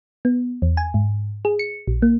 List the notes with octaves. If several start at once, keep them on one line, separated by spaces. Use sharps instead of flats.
B3
E2
G#5
G#2
G#4
C#7
A#1
A#3